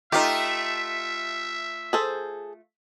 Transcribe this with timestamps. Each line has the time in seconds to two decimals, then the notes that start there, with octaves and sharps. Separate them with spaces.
0.12 A3 D#4 F4 G4 E5
1.93 G#4 A4 C5